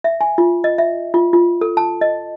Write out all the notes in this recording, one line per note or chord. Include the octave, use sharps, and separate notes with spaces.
E5
G#5
F4
D#5
E5
F4
F4
A4
A5
D#5